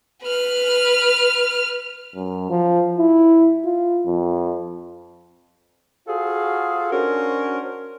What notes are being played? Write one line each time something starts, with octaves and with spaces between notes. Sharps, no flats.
B4 F6
F#2
F3
E4
F4
F2
F4 F#4 G#4 A4 C5 F5
C#4 D4 F#4 A#4 C5